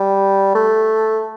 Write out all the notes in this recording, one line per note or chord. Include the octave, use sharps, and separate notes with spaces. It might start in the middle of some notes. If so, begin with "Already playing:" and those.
Already playing: G3
A3